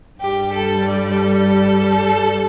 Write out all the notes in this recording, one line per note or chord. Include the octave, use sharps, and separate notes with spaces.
G2 G3 G4
A4
D5
A4